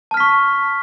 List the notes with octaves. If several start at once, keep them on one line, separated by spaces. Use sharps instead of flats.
A5 C#6 F6 B6